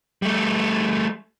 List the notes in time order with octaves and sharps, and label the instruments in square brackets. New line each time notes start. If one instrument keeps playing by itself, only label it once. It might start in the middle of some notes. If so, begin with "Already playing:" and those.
[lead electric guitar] G3 A3